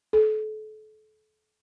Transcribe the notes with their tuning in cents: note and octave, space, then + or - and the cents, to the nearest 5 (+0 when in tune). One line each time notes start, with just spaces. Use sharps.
A4 -35